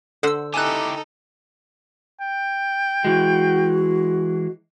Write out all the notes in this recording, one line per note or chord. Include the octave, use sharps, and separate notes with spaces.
D3 A4 C5 F#5 E6
D#4 E4 G4 A4 G#5 F#6
G5
E3 G#3 F#4